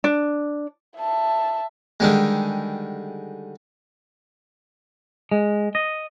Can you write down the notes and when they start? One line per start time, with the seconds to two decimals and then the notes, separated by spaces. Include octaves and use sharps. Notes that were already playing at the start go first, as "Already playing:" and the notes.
0.04 D4
0.98 E5 A5
2.00 D3 D#3 G3 G#3
5.32 G#3
5.75 D#5